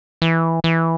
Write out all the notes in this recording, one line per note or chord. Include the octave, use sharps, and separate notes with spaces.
E3
E3